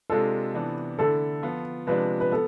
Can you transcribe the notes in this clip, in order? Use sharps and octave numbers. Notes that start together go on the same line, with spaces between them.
C3 G#3 D4 F4 A4
C3 E3 B3 D4
D3 A3 E4 A4
F3 B3 F4
C3 F3 G#3 D4 B4
B4
B3 A4